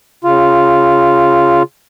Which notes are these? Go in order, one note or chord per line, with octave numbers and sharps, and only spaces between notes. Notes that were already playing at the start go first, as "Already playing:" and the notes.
C#3 F4